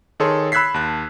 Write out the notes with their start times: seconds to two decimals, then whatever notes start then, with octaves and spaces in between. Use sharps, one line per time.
0.20 D#3 G#4 A4 C#5 C6
0.52 B5 E6 F#6 G#6 B6 C7
0.74 D#2 A5 F#6